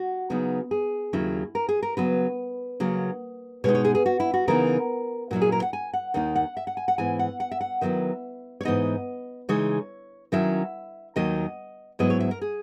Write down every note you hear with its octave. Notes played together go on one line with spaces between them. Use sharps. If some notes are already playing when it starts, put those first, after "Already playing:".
Already playing: F#4
C#3 F#3 B3 D#4
G#4
D#2 C#3 F#3 C#4 E4
A#4
G#4
A#4
C#3 F#3 B3 B4
C#3 F#3 A#3
B2 G#3 D#4 C#5
C#5
G#4
G#4
F#4
E4
F#4
C#3 E3 B3 D#4 A#4
A#2 F#3 C#4 E4 F#4
G#4
A#4
F#5
G#5
F#5
D#2 D#3 A#3 D#4 F#5
F#5
E5
F#5
G#5
F#5
G#2 E3 B3 E4 G#5
F#5
F#5
E5
F#5
D#3 F#3 B3 E4 E5
C#5
G#2 E3 B3 D#4 D#5
C#3 E3 G#3 D#4 C#5
D#3 F#3 C#4 E4 E5
D#2 D#3 F#3 A#3 D#5
G#2 F#3 B3 E4 D#5
C#5
E5
A#4
G#4